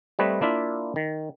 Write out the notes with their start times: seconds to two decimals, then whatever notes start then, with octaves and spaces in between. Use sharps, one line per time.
0.19 G3 A3 C4 B4 C#5 D#5
0.41 A#3 D4 E4 F4 E5
0.96 D#3